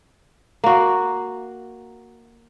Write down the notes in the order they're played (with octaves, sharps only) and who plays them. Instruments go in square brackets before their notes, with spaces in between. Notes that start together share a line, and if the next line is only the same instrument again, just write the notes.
[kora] A#3 F#4